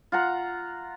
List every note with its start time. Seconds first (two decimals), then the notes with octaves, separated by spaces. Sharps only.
0.12 F4 F#5 A#5